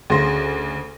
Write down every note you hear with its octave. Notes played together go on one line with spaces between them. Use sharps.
D2 C#3 C6 A#6